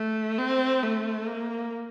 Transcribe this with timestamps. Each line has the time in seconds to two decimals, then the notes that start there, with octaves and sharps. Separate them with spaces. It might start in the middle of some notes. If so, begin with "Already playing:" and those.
Already playing: A3
0.38 C4
0.83 A3
1.27 A#3